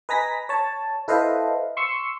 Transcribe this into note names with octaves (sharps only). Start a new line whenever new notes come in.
B4 D#5 G#5 A#5 A#6 B6
C#5 A5
E4 A4 B4 C5 D#5 F5
C6 C#6 E6